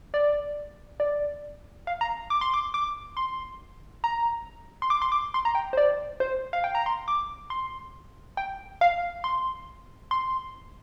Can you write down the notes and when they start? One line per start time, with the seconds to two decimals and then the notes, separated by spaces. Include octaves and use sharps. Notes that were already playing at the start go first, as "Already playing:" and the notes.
0.14 D5
1.00 D5
1.87 F5
2.01 A#5
2.30 D6
2.41 C6
2.54 D6
2.74 D6
3.17 C6
4.04 A#5
4.82 C6
4.90 D6
5.02 C6
5.12 D6
5.34 C6
5.45 A#5
5.55 G5
5.73 C5
5.77 D5
6.20 C5
6.53 F5
6.64 G5
6.75 A#5
6.86 C6
7.08 D6
7.50 C6
8.37 G5
8.81 F5
9.24 C6
10.11 C6